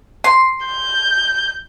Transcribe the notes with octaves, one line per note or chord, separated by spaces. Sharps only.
C6
G6